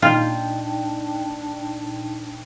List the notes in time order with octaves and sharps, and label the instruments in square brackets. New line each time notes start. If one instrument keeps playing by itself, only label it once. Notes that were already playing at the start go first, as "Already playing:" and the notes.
[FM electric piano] A#2 D#4 G5 [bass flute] D4 [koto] F4